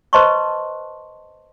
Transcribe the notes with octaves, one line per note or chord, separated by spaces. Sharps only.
B4 C5 D#5 A5 C6 C#6